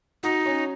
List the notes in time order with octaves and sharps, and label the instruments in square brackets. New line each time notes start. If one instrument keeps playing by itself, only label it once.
[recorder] D#4 [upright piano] F#4
[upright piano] C#4